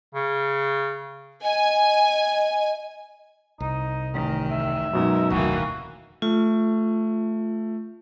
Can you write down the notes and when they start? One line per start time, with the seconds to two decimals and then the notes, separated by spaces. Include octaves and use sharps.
0.14 C#3
1.43 D#5 G#5
3.60 C2 D#4
4.14 A1 D#3
4.51 E5
4.93 F#2 B2 G#3 D#4 A#4
5.30 F1 D2 D#3 E3 A#3 F#4
6.22 A3 F4